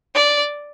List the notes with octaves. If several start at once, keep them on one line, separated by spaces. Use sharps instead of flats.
D5